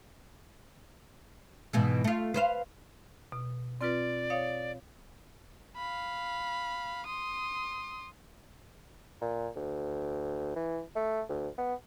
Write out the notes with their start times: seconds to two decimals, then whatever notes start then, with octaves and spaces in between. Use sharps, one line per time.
1.73 G#2 B2 E3
2.04 A3 F4
2.34 B4 C5 F5
3.32 B2
3.81 C4 F4 B4 D5
4.30 C#5 F5 D#6
5.77 F5 B5
7.06 C6 D#6
9.21 A#2
9.56 D2
10.56 E3
10.96 A3
11.29 D2
11.58 B3